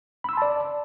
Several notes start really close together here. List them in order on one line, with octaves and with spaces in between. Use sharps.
B5 E6 C6 A5 D5